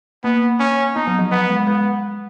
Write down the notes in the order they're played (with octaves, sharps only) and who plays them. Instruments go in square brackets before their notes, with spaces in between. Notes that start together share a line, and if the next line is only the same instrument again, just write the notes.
[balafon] A#3 [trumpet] B3
[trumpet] C#4
[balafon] B3 [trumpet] D#4
[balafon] F#3
F3
[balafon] F#3 [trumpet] B3
[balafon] G#3
[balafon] G#3 [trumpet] B3